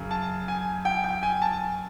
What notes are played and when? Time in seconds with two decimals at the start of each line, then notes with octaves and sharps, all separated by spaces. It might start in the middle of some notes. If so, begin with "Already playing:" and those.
Already playing: F#2 C#3
0.11 A5
0.48 G#5
0.85 G5
1.04 G5
1.23 G#5
1.42 A5